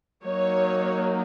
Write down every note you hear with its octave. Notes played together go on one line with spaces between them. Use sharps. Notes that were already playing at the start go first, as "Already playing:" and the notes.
F#3 A#3 D#4 C#5